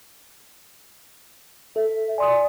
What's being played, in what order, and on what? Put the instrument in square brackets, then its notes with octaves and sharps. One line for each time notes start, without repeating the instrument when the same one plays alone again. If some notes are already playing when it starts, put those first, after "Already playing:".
[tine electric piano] A4 [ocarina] E5
[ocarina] D5 [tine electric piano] G#5 C6 D#6